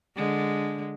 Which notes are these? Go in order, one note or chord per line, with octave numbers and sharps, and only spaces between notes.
D3 G#3